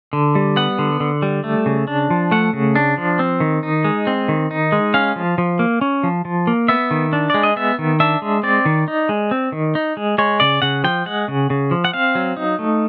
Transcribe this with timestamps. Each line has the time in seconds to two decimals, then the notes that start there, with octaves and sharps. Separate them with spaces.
0.13 D3
0.35 G3
0.56 B3 F#5
0.79 D3
1.00 D3
1.22 G3
1.44 A3
1.66 C#3
1.88 D4
2.10 F3
2.31 A3 F#5
2.53 C#3
2.75 D4
2.98 F3
3.19 C4
3.40 D#3
3.63 D#4
3.85 G#3
4.07 C4
4.28 D#3
4.51 D#4
4.72 G#3
4.94 C#4 F5
5.16 F3
5.38 F3
5.59 A#3
5.81 C#4
6.03 F3
6.25 F3
6.47 A#3
6.68 B3 E5
6.91 D#3
7.13 D4
7.30 G#3 D5
7.43 D#5
7.56 B3 E5
7.79 D#3
8.00 D4 E5
8.22 G#3
8.43 C4 D5
8.66 D#3
8.88 D#4
9.09 G#3
9.31 C4
9.52 D#3
9.75 D#4
9.97 G#3
10.18 G#3 C#5
10.40 C#3 D5
10.62 C#3 F#5
10.84 F3 G5
11.06 G#3 F#5
11.28 C#3
11.50 C#3
11.71 F3
11.85 F#5
11.93 C4 F5
12.15 F#3
12.37 D#4
12.59 A3